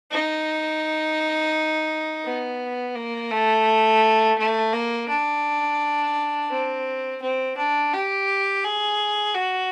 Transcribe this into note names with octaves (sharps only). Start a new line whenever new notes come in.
D#4
B3
A#3
A3
A3
A#3
D4
C4
C4
D4
G4
G#4
F#4